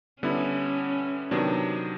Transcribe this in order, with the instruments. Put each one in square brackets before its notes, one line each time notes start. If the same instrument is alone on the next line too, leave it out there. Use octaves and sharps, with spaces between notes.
[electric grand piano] D3 G3 B3 E4 [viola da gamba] C#4
[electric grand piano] C3 D#3 F#3 B3 D4